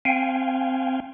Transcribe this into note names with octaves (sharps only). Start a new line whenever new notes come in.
C4 F5 G5 G#5